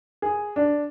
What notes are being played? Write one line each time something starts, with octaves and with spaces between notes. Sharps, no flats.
G#4
D4